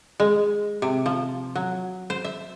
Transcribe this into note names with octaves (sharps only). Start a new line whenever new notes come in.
G#3
C3
F3
F#3
C5
E5